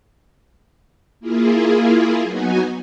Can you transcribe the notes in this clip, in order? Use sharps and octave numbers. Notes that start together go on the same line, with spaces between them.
A#3 E4 F4 G#4
F#3 B3 D#4 F#4 G#5